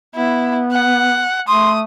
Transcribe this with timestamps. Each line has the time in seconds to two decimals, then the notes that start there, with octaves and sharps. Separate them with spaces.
0.15 B3 E4
0.72 F#5
1.48 A3 C6 D#6